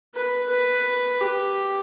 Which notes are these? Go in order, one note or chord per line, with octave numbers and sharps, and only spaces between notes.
B4
B4
G4